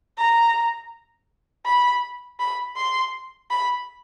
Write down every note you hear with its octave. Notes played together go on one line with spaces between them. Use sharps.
A#5
B5
B5
C6
B5